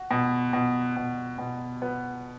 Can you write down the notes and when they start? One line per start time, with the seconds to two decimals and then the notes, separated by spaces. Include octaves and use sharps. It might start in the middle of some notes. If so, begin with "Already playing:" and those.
Already playing: F#4
0.11 B2
0.53 B2
0.96 B2
1.38 B2
1.82 B3